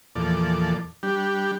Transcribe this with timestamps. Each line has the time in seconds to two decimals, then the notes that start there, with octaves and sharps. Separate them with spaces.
0.15 E2 A#2 F3 A4 D5
1.03 G3 D4 G4